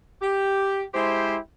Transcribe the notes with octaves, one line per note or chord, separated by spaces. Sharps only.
G4
G#3 E4 G4 C5